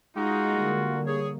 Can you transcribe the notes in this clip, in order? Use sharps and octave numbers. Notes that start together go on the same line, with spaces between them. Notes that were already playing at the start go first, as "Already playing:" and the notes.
G#3 D#4 F4 F#4
D3 G3 A#3
G#4 C#5